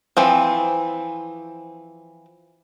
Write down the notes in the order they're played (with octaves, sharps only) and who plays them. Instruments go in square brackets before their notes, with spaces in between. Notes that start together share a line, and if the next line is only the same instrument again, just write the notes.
[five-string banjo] E3 F3 C4